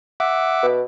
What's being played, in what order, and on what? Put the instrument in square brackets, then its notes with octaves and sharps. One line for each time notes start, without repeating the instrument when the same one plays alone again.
[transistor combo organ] E5 F#5 D6
[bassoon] B2